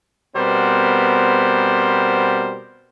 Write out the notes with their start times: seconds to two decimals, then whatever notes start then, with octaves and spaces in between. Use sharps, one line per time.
0.36 B2 G3 B3 C4 A#4 C5